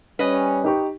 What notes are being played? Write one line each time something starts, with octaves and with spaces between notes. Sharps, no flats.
G3 C#4 B4 D#5
D#4 G4 C#6